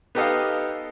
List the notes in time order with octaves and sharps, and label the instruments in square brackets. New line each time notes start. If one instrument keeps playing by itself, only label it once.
[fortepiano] B3 D#4 G4 A4 D#5 F5